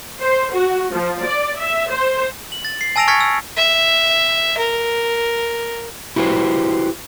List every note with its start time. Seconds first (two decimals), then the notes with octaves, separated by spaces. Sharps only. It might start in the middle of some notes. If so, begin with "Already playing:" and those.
0.20 C5
0.52 F#4
0.92 F3
1.22 D5
1.58 E5
1.90 C5
2.52 F#7
2.65 A6
2.81 C7
2.96 G#5 A5 E6 A#6 D7 F7
3.08 C#6 F6 G#6 A6 B6 C#7
3.21 E6
3.57 E5
4.57 A#4
6.16 E4 F#4 G4 B4 C5